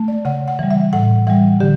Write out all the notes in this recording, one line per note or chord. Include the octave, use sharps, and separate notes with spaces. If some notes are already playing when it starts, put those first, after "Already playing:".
Already playing: A3
D5
C#3 F#5
F#5
E3 G3
E5
A2 F#5
E3 G3 F#5
D3 G4